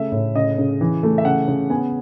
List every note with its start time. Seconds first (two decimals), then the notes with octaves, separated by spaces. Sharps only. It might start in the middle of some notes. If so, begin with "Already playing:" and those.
Already playing: C#3 A3 E5
0.12 A2
0.35 C#3 D#5
0.58 C#3
0.81 E3
1.03 A3
1.18 E5
1.25 C#3 F#5
1.48 C#3
1.70 B3 G#5